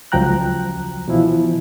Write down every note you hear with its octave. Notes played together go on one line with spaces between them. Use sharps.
C#2 F3 F#3 G5 A#5 F#6
B2 E3 F3 E4